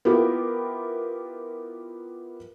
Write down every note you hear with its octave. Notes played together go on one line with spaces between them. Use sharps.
B3 E4 F4 G4 A#4